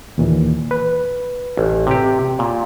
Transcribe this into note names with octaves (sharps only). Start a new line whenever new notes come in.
D#2 A#2 E3
B4
A1
C3 G4
A#2